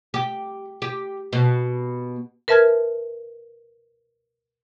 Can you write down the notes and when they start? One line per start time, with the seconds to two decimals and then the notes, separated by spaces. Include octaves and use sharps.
0.14 G4
0.82 G4
1.33 B2
2.48 A#4 B4 E5 A5 F6 G#6